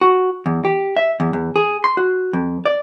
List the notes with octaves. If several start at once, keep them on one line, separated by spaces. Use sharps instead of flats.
F#4
E2
G4
E5
E2
E2
G#4
C6
F#4
F2
D5